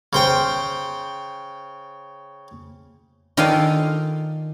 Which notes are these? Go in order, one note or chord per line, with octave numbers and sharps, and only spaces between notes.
C#3 C5 G5
D#3 F4 A4 D5 F5 G#5